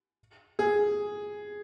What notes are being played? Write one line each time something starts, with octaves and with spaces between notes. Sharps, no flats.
G#4